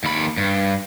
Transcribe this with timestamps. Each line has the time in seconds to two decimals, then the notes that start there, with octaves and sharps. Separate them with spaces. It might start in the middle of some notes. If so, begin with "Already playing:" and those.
0.04 D#2 B5
0.37 G2